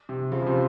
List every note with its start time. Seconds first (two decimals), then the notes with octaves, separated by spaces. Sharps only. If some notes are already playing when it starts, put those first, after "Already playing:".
0.09 C3
0.31 C#3 F3
0.42 C#3
0.46 C3